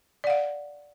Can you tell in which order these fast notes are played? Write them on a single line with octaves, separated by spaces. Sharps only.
D5 F#5 F5